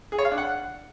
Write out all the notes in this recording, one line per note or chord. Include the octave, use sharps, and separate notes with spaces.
G#4
C#5
F5
D4
F#5